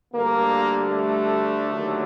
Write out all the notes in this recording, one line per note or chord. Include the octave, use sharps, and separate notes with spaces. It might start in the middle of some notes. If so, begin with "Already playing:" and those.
D2 D3 G3 A#3
A3
D#2 D3 F#3